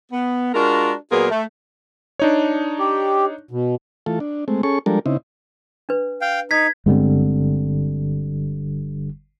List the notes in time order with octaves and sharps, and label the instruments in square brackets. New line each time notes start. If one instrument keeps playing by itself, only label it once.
[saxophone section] B3
G#3 D4 F4 F#4 A#4
A#2 F#3 B3 F4 G#4 A#4
A3
[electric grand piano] D4 D#4 C#5
[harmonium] G4
B2
[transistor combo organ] E3 A3 F4 A4
D4
G#3 A3 C4
C#4 G#4 A4 C#6
F3 G3 G#3 D4 A4 A#4
C#3 C4 D#4 E4
[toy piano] D4 B4
[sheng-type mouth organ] F5 G5
[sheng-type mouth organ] D#4 [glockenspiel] G#6 B6
[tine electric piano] G1 D3 G3 [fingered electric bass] G#3 C4